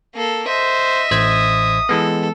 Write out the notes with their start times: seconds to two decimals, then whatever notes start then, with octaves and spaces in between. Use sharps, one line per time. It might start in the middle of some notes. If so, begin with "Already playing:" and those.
0.15 A#3 A4
0.48 C5 D#5 E5
1.11 A1 C5 D#6 G#6
1.89 E3 G#3 B3 A4